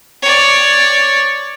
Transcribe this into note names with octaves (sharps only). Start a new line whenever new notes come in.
C#5 D5